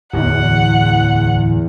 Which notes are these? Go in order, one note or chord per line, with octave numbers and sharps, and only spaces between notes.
D1 E2 F#5